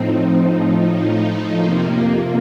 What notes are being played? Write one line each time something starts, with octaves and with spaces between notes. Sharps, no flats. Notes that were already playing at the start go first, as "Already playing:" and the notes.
Already playing: A2 F3 C4 D#4
A2 F3
F2 C3 F3 A#3